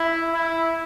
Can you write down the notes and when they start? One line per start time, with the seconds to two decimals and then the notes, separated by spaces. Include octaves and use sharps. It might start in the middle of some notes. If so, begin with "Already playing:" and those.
Already playing: E4
0.33 E4